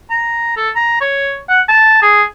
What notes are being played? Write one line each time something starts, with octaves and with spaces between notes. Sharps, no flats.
A#5
A4
A#5
C#5
F#5
A5
G#4